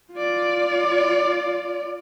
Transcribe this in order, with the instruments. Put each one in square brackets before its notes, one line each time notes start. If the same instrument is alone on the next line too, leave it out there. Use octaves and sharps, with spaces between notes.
[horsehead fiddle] F4 D5